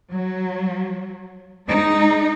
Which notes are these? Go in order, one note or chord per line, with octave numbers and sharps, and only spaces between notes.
F#3
G#3 D#4